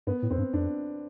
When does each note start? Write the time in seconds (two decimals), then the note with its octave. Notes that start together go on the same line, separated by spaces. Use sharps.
0.07 G2 B3
0.22 A2
0.30 F2 C4
0.38 G2
0.53 F2 D4